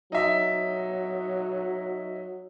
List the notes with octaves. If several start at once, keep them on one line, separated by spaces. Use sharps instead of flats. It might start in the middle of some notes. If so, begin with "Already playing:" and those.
F#3 D#4 E5